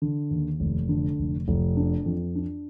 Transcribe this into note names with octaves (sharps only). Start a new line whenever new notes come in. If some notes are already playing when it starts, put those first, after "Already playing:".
D3
D#2
F1
D3
F1
F1
D4
F2
D4